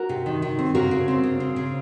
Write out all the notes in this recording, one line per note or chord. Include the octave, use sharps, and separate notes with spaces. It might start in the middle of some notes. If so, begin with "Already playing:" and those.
Already playing: F#4 A#4
C3
D#3
D#3
C4
C#3 F#4 A#4
C#3
C4
C#3
C4
C#3